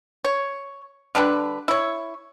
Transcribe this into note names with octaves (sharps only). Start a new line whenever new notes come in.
C#5
D3 G3 D4 B4
E4 C#5